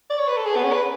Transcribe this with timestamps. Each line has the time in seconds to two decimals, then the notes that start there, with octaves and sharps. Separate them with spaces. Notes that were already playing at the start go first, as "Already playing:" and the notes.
0.10 D5
0.18 C#5
0.28 B4
0.37 A4
0.45 G#4
0.56 B3
0.64 C#4
0.72 B4